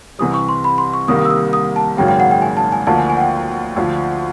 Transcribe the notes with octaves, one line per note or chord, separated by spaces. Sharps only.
C2 C3 E3 G3 D#6
C#6
C6
B5
C6
C#6
C2 C3 D#3 G3 A#3 D#6
D#6
E6
D#6
D#6
A5
G#1 F#2 C#3 F#3 A#3 G5
G5
F#5
G5
G#5
A5
G#5
D2 D3 F3 A#3 A5
G#5
G#5
F#5
G5
D2 D3 F3